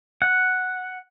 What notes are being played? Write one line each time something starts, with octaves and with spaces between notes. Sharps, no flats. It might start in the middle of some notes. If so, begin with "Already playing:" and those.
F#5